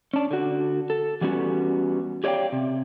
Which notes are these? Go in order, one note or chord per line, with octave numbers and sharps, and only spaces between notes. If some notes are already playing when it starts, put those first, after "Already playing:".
C#4 D4
D3 F#4
A4
E3 G3 B3 C#4 F#4
G4 C#5 D5 E5 F5 G5
C3